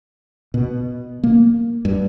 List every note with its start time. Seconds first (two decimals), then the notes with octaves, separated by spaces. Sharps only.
0.54 B2
1.24 A#3
1.85 G2